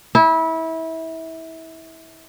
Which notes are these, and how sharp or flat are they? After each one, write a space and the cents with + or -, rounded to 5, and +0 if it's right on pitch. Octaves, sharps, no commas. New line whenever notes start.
E4 -25